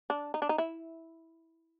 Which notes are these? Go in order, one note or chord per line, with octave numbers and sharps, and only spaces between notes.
D4
D#4
D4
D#4
E4